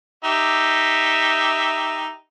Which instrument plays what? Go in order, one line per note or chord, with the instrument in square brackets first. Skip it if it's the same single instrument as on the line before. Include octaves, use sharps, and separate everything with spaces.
[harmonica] D#4 G4 E5